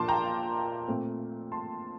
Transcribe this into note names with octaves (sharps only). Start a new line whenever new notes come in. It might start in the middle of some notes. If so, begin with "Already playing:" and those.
Already playing: A#2 F3 A#3 D4 A5 C6 D6
G5 A#5
A#2 A3 C4
A5 C6